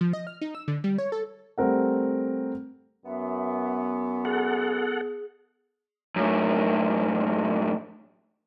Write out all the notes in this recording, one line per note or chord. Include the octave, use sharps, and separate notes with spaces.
F3
D#5
F6
D#4
E6
D3
G3
C#5
A4
G3 A3 C4 A#4 F#5
F#2 B3 E5
G#4 A4 F#5
F#2 A2